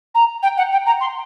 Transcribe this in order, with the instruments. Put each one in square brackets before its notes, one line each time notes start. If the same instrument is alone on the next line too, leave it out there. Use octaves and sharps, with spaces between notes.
[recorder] A#5
G5
F#5
G5
A#5
C6